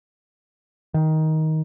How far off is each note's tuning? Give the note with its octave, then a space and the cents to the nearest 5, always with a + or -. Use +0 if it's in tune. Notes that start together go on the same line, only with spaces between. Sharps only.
D#3 +15